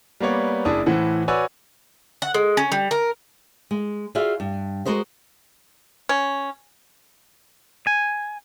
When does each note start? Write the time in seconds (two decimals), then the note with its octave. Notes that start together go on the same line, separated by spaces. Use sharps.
0.20 G3 A#3 B3 C#5 D5
0.65 F#1 D4 E4 G#4 A5 D#6
0.86 A2 E3 C5 F#5
1.28 F#4 B4 C#5 D5 G#5 E6
2.22 F#5
2.34 G#3
2.57 C#4
2.72 G3
2.91 A#4
3.71 G#3
4.15 F4 F#4 G#4 D5 E5 F5
4.40 G2
4.86 G#3 F#4 A#4 C5 D#5
6.09 C#4
7.87 G#5